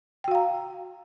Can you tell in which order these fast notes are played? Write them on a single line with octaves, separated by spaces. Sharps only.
G5 F#4 F5 A#5